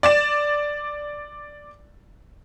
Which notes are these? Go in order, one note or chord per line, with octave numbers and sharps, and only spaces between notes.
D5 A6 E7